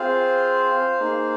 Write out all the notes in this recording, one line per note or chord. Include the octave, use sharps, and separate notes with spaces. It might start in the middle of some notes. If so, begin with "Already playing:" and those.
Already playing: C4 F4 G#4 C5 F5
A#3 D#4 G#4